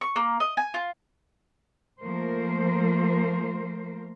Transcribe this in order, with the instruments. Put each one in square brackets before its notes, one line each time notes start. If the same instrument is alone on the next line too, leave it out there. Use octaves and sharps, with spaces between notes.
[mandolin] C#6
A#3
D#5
G#5
F4
[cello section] F3 A3 A#3 A#4 C5